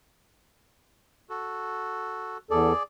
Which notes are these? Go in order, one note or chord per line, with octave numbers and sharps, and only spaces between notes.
F#4 A4
E2 G#4 A4 D5